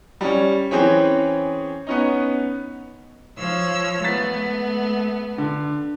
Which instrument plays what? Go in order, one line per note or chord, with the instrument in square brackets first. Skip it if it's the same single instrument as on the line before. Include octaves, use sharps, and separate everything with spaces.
[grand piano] G3 C#4
E3 C4 C#4 G#4 C#5
B3 C#4 D#4
[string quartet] F3 C#5 E6
[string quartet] A3 B3 [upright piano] A6 B6
[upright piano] D3